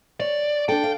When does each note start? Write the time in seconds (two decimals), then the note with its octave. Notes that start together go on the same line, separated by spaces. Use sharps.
0.20 C#5 D5
0.69 D4 A4 G5
0.84 F5